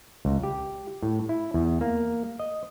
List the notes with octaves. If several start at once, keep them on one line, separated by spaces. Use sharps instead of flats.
C#2
G4
A2
E4
E2
A#3
D#5